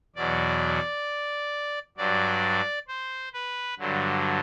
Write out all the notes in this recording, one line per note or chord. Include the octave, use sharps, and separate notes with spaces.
E2 B2 F#3 D5
G2 F#3 D5
C5
B4
G2 D3 F#3